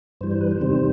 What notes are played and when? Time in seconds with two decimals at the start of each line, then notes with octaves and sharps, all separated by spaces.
0.21 G2 E3 G3 C5
0.31 C5
0.41 B4
0.51 C5
0.60 E2 C3 D#3 G3